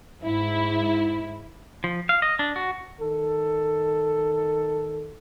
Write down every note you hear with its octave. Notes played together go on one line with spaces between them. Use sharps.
G#2 E4
F3
F5
D#5
D4
F#4
D#3 A4